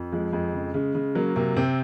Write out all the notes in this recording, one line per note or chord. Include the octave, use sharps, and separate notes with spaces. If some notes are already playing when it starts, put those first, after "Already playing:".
Already playing: F2
F3 G#3
F2 G#3
C#3
C#3
C#3
F#3 A#3
C3 A#3
C3 C4